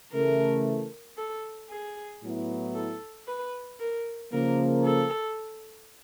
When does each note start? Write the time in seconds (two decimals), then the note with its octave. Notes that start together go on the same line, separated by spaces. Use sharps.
0.12 C#3 E3 A3 A#4
1.18 A4
1.69 G#4
2.23 A2 F#3 B3 E4
2.75 A4
3.27 B4
3.80 A#4
4.32 C#3 F3 A#3 A#4
4.84 A4